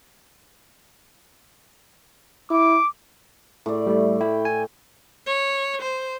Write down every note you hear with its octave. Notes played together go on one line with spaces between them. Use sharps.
E4 D6
A2 D5
G3 A3
E4 G5
G#5
C#5
C5